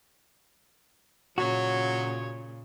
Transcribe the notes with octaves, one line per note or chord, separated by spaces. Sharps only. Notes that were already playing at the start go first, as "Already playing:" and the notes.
A#2 C#3 F#3 F#4 C#5